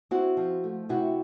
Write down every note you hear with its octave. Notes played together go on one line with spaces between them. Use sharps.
C4 E4 F#4
F3
A3
C3 E4 F#4